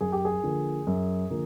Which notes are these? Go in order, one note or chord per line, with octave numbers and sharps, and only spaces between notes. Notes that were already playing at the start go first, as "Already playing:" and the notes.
F#2 G#4
G4
G#4
D3 F3 A#3
F#2
D3 F3 A#3